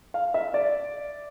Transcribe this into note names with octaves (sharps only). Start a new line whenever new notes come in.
F5
E5
D5